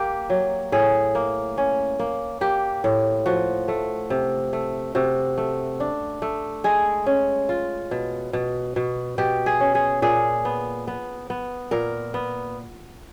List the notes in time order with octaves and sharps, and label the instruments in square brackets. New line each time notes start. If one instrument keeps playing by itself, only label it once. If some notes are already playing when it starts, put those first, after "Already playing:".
Already playing: [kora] A#3 G4
F#3
A2 G#4
A#3
C#4
A#3
A#3 G4
A2
F3 F#4
A3
C3
A3
C3 F#4
A3
D4
A3
G#3 G#4
C#4
F4
B2
B2
B2
B2 G4
G#4
C#4
G#4
A#2 G#4
B3
B3
B3
A#2 A#4
B3